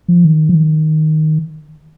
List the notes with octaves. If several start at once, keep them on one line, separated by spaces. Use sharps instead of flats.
F3
D#3
F3
D#3